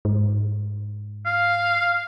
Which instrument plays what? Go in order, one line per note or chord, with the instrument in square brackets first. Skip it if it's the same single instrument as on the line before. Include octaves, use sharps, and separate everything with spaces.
[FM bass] G#2
[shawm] F5